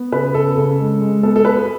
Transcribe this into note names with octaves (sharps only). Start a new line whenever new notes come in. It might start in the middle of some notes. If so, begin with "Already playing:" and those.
Already playing: B3
C#3 B4
C#3 A4
C#3
G#3
G#3
B3 A4
A4
B3 B4